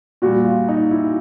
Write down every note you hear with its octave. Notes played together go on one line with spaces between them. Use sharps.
A#2 G3 F#4
F4
D#4
E4